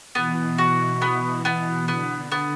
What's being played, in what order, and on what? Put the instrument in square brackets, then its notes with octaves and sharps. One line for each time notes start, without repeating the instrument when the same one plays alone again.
[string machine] B2 E3 [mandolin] B3
[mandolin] F#4
B3
B3
[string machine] D3 [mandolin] B3
[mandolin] B3